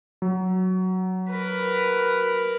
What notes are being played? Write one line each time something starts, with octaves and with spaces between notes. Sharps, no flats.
F#3
A#4 B4